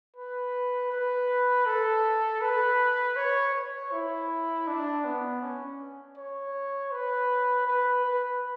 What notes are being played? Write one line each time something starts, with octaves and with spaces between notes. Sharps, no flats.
B4
B4
A4
B4
C#5
C#5
E4
D4
B3
C#4
C#5
B4
B4
B4